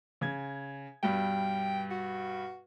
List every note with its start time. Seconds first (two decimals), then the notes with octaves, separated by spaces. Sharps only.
0.21 C#3 G#6
1.03 G2 B2 G3 G5
1.91 F#4